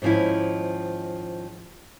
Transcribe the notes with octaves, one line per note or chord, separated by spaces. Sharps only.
G#2 D#3 F3 C#4 E4